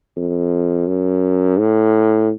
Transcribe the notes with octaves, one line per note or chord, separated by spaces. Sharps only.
F2
F#2
A2